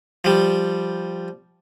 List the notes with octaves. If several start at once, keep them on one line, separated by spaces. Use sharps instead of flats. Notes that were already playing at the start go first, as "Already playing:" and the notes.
F3 G3